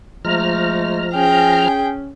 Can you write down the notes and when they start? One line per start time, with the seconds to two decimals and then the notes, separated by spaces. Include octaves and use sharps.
0.25 F3 G#3 A3 A#5 F6
1.14 C#4 G#4 G5